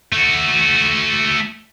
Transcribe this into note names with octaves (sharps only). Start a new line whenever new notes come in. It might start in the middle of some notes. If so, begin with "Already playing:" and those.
A3 F#4